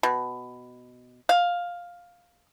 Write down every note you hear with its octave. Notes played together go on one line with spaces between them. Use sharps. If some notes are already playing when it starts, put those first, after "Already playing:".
B2
F5